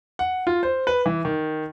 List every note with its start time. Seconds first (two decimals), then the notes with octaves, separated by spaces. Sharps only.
0.19 F#5
0.47 F4
0.63 C5
0.87 B4
1.06 E3
1.25 D#3